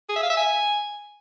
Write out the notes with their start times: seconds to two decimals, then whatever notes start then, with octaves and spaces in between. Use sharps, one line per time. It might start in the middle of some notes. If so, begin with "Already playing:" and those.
0.09 G#4
0.16 E5
0.23 F5
0.30 E5
0.37 G#5